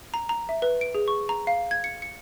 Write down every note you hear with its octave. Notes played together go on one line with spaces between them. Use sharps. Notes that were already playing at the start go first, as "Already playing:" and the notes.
A#5
A#5
E5
B4
D7
G#4
C#6
A#5
F5
G#6
C#7
C#7